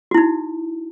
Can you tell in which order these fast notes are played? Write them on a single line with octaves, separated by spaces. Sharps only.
F#4 E4 D#4